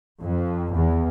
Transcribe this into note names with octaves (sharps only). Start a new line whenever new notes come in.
F2
E2